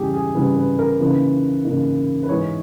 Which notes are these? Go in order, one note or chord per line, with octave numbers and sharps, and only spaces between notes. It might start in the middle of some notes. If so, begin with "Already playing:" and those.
Already playing: C#3 E3 G3 G4 G#4
G#4
C#3 E3 G3 B4
B4
A#4
C#3 E3 A#3 D#4 B4
C#3 E3 A#3 D#4
B4
E3 G#3 D#4 C#5